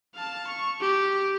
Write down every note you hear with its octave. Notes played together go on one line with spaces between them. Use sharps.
F5 A5
C#6
G4